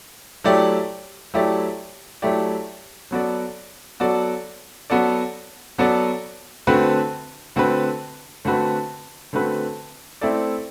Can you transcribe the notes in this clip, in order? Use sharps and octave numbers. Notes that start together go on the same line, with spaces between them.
F#3 A3 E4 G4 D5
F#3 A3 E4 G4 D5
F#3 A3 E4 G4 D5
F#3 B3 F#4 A4 D5
F#3 B3 F#4 A4 D5
F#3 B3 F#4 A4 D5
F#3 B3 F#4 A4 D5
D3 A3 C4 F#4 B4
D3 A3 C4 F#4 B4
D3 A3 C4 F#4 B4
D3 A3 C4 F#4 B4
A3 C4 E4 A4 D5